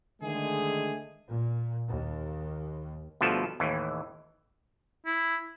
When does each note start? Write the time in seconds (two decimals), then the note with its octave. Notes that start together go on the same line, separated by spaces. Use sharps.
0.22 D3 D#3 G#3 A3 G#4
1.27 A#2
1.87 D#2
3.21 D2 B2 F3 G3 B3 A4
3.60 D#2 A2 E3
5.06 E4